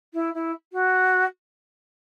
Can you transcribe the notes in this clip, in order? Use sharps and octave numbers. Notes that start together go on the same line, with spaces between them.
E4
E4
F#4